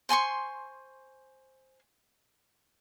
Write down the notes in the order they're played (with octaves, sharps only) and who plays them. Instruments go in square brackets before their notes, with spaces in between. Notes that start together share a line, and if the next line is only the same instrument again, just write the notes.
[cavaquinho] C5 G#5 C6 C#6